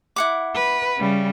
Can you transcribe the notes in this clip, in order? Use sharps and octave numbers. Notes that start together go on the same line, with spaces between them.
E4 F#5 D6
B4
C#3 G3